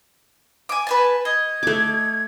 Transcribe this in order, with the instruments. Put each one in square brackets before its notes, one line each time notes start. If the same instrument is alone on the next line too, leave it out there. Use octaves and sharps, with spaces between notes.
[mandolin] G#5 D6
B4 G#5 A5
[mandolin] D#5 [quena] G#6
[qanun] A3 D6